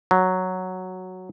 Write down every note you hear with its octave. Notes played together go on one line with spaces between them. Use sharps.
F#3